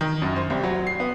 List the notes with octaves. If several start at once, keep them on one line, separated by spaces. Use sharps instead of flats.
D#3
F#2
C5
C2
F#3
C7
B3